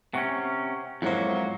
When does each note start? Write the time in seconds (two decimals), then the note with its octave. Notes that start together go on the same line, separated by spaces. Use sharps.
0.14 C3 C#4 F#5 C#6
1.02 F2 G#2 F#3 A#3 E4 C5